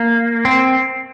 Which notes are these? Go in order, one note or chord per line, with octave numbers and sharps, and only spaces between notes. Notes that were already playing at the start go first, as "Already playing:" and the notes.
Already playing: A#3
C4